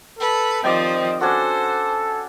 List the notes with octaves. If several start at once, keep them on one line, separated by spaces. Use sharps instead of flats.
A4 B4
D#3 F3 C4 G4 D5 D#5 G5
C#4 D4 F#4 A4 C5